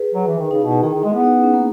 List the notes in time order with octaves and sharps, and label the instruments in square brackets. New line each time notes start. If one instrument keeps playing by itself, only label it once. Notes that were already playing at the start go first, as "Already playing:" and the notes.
Already playing: [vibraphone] G#4 B4
[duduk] F#3
E3
D#3
[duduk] C#3 [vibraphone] D#4
[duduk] B2 [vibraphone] E4
[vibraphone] F#4
[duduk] D#3 [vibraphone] E4 G#4
[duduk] D#3
[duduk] G#3 [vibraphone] E4
[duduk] B3
[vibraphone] D#4
C#4
C#4
A#3